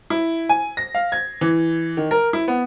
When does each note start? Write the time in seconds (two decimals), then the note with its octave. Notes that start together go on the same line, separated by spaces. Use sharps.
0.10 E4
0.49 G#5
0.77 A#6
0.95 F5
1.12 G#6
1.41 E3
1.97 D#3
2.11 A#4
2.33 E4
2.48 B3